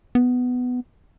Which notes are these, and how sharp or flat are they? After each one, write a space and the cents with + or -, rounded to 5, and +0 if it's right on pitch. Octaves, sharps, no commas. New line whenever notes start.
B3 +10